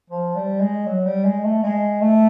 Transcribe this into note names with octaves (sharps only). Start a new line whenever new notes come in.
F3
G3
G#3
F#3
G3
G#3
A3
G#3
A3